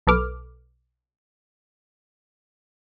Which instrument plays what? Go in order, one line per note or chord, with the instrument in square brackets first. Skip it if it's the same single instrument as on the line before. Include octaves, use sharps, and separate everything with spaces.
[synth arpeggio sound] B1 A4 B4 D6 F6